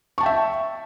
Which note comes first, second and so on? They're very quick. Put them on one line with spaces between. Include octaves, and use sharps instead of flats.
C#6 A5 G5 E5